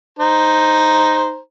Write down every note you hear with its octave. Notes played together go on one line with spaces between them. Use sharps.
D#4 C5 A#5